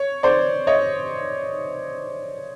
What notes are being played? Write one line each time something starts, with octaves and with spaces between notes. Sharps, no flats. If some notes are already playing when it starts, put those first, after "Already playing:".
Already playing: C#5
C5 D5
C#5 D#5